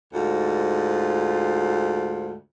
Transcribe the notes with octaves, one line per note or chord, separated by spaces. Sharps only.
D2 G#2 F4